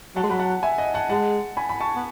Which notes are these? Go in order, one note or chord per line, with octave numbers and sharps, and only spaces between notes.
F#3 F#5 A5
G#3
F#3 B5
F#5 A5
E5 G#5
D#5 F#5
F#5 A5
G#3 F#5 A5
G#5 B5
B5
A5 C#6
B3